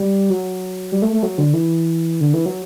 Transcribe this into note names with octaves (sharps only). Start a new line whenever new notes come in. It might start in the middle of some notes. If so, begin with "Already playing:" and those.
Already playing: G3
F#3
G3
A3
A3
F#3
D3
E3
D3
E3
F#3